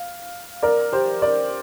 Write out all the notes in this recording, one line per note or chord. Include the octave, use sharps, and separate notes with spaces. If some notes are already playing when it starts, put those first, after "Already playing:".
Already playing: F5
A#4 D5
G4 C5
A#4 D5